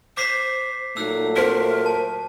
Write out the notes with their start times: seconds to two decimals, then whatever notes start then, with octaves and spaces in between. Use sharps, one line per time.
0.17 C5 D6 B6 C7
0.97 A#2 F#3 A3 D#4 E6 F#6
1.36 A#4 C5 B6
1.86 A5